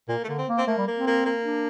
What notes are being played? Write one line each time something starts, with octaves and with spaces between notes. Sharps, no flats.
A#2 A#3
A3
D3 A#3
C4
A#3
C4
A3 A#3
G3
A#3
C4
A#3
A#3
D4